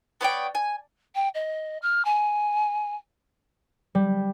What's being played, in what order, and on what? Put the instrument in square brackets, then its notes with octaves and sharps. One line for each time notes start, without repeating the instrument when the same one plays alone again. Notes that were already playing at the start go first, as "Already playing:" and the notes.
[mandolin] B3 C#5 D5 G5
G#5
[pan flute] G5
D#5
F6
G#5
[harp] G3